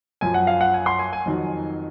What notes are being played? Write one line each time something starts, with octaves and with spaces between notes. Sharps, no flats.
F#2 F3 G#5
F#5
F5
F#5
G#5
C6
G#5
G#5
F2 D#3 F#3